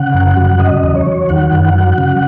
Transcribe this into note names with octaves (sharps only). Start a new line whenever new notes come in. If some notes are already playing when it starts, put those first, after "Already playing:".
Already playing: C#3 F#5
F#2
F#3
C#3 D#5
E2
C#5
F#3
D#3 F#5
F#2
F#3
C#3